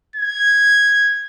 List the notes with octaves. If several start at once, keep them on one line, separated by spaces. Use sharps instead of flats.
G#6